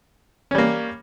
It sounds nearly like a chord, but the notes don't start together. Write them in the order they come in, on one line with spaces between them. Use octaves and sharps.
C#4 G3 A#3